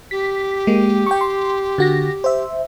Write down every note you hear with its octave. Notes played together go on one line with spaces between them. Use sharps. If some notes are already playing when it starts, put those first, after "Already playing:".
G4 B6
G#3 A#3
G5 C#6
C6
D3 F#4 A#6
C5 E5